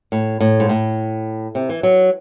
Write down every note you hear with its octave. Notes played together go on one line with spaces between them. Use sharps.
A2
A2
G#2
A2
C3
E3
F#3